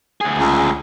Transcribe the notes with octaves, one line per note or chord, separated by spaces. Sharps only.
D2 G#4
C#2